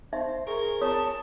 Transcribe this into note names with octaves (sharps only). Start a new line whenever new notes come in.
D#4 C5 E5
G#4 A#4 C#6
F4 C#5 A5 D#6